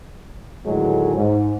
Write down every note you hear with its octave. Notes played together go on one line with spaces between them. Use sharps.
A2 D3 D#3 F#3 G#3
G#2